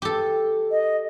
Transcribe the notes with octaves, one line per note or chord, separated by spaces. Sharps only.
G4 A4
D#5